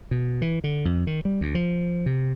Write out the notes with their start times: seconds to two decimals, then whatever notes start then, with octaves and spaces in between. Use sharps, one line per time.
0.11 B2
0.42 E3
0.64 D3
0.85 F2
1.07 D#3
1.25 G3
1.41 D2
1.55 F3
2.06 C3